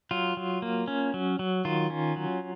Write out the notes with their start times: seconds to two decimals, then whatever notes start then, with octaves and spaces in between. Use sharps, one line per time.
0.11 F#3 F4
0.37 F#3
0.62 A#3
0.88 C#4
1.14 F#3
1.39 F#3
1.65 D#3 F4
1.90 C#4
2.16 F#3